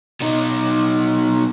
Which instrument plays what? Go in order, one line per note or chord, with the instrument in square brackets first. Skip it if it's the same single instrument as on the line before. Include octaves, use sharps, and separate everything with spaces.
[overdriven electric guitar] B2 D#4